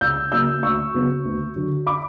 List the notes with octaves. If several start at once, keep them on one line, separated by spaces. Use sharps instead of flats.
C#2 E6 G6
C#3 F#3 A#3 E6 G6
D2 C#6 E6
C#3 F#3 B3
D2
D3 F#3
B5 D6